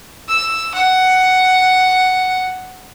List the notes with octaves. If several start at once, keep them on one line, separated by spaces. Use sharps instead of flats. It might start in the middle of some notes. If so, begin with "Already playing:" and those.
E6
F#5